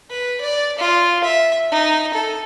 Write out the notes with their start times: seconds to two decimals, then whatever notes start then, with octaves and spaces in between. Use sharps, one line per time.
0.10 B4
0.41 D5
0.79 F4
1.24 E5
1.72 D#4
2.14 A4